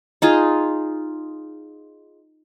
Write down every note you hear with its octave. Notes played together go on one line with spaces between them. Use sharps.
D#4 F4 G#4